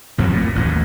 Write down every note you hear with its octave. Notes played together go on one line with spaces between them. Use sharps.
A1 F2 F#3 C4
A#2
A1 D#2 A2